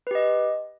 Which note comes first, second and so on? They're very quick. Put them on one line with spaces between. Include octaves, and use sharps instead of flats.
B4 G4 D#5